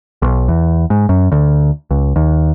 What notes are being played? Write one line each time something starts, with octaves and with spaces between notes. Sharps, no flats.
B1
E2
G#2
F#2
D2
C#2
D#2